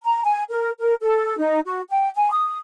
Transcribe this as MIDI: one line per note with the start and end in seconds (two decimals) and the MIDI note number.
0.05 0.21 82
0.24 0.42 80
0.50 0.70 70
0.80 0.93 70
1.01 1.37 69
1.38 1.60 63
1.66 1.81 66
1.90 2.09 79
2.15 2.30 80
2.31 2.56 87